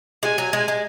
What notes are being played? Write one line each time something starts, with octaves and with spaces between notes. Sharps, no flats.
G#3 G#5
F#3
G#3
G#3